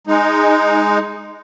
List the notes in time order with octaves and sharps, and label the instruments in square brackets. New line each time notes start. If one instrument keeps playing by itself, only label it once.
[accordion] G#3 D#4